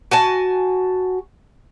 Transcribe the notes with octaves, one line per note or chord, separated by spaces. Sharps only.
F#4 G#5 A5